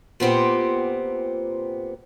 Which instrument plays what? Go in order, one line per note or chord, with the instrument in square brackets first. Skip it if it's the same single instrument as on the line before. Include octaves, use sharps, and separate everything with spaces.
[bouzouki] A#2 B3 C4 G4